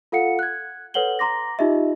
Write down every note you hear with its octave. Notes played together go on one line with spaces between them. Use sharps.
F4 A4 F5 F#5 C#7
F#6 G#6
A4 B4 C#5 F#5 F#7 G7
A#5 C6 D6 A#6
D#4 F4 G4 D#5 E5